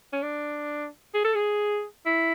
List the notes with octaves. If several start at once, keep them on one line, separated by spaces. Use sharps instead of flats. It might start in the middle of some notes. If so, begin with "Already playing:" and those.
C#4
D4
G#4
A4
G#4
E4